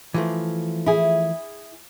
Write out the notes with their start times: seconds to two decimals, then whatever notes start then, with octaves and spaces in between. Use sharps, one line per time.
0.14 E3 F3 A3
0.86 E4 G#4